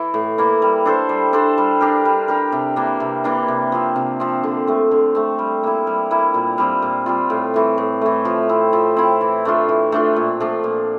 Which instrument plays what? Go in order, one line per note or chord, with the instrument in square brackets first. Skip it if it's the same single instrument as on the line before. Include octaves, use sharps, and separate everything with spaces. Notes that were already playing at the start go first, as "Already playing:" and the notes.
Already playing: [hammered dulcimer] E3 E4
A2
E3 A#3 E4
G3
D4 A4 C5
G3
D4 A4 C5
G3
D4 G4 A#4
G3
D4 G4 A#4
C3
E3 A#3 D4
C3
E3 A#3 D4
C3
F3 C4
C3
F3 C4
D3
A3 C4
D3
A3 C4
G3
A#3 E4
G3
A#3 E4
A#2
G3 C4 F4
A#2
G3 C4 F4
A2
E3 A3
A2
E3 A3
F3
C4 E4
F3
C4 E4
E3
A3 D4 F4
E3
A3 D4 F4
A#2
F3 A3 D4
A#2